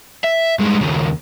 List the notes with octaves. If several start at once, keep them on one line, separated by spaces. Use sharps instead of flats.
E5
G2 G#3
D#2 C#3